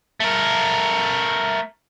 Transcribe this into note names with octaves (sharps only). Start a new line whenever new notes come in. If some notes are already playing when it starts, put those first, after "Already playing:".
A3 A#4